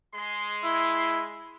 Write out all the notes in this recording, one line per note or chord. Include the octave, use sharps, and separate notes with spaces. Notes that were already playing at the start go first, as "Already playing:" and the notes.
G#3 C6
E4